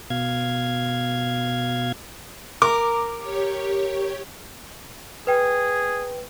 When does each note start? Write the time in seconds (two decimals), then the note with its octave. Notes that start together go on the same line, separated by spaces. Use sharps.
0.10 B2 F5 G#6
2.62 A#4 D6
3.18 G4 C#5
5.27 G#4 B4 G5